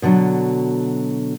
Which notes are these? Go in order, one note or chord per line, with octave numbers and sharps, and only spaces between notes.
B2 D3 F3 F#3